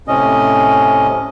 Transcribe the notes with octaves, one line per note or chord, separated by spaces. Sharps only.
A2 C3 C#4 D#5